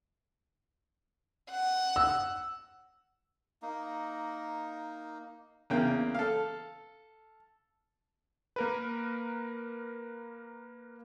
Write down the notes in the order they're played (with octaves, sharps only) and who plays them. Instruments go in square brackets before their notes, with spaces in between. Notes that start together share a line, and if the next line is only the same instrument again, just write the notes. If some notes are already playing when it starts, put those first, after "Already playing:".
[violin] F#5
[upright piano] E6
[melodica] A#3 D#4
[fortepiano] E2 C#3 A#3 G5
A4 F5
[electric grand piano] A#3 A#4 B4